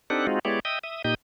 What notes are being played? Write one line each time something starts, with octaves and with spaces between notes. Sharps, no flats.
C4 D4 D#4 G4 A4 F#5
G#3 C4 D#4 F4 F#4
G#3 B3 E4 G4 C#5 D5
D#5 E5 G5 D#6
E5 D#6
A#2 D#4 G4 D#5 D#6 G6